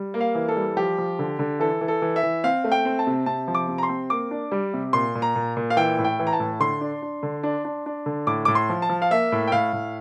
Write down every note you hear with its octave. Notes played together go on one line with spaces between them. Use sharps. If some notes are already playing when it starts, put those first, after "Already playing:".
Already playing: G3
A#3
F5
E3
A4
G3
F3 G4
F3
D3
D3
E3 A4
E3
A4
E3
E5
E3
C4 F5
A3
G5
C4
A5
C3
C3 A5
F3
D6
C3
A#5
C6
C4
A#3 D6
D4
G3
C3
A#2 C6
A#2
A#5
A#2
A#2
F5
E3 G5
A2
G5
E3
A#5
A5
A2
D3 C6
D4
D4
D3
D4
D4
D4
D3
A2 D6
A2 D6
C6
F3
A5
F3
F5
A#3 E5
A2
G5
A2 F5
A2